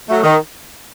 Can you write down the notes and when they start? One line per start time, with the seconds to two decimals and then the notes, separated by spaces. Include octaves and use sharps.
0.08 F#3 A3
0.23 D#3